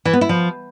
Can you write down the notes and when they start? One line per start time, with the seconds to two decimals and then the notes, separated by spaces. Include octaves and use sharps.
0.05 E3
0.13 B3
0.21 E4
0.29 F3